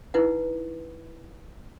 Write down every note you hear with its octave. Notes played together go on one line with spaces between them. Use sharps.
D#4 E4 B4 F#5